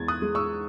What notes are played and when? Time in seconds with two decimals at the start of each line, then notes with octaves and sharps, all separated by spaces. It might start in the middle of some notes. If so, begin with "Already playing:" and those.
Already playing: E2 G#3 G#6 A6
0.08 D#6 F#6
0.22 G#3
0.35 C#6 E6